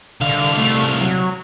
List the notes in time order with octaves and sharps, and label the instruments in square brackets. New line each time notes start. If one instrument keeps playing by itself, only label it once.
[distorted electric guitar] C2 F5 [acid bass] D3
[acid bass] A3
F#3